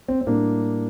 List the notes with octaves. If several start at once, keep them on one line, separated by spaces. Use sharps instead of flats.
C4
C4
A2 G3 A#3 D4